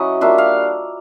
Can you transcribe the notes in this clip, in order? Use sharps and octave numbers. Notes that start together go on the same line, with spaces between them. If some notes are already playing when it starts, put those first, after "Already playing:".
Already playing: F#3 C#4 E4 D#5
G3 A#3 D4 F4 E5
F5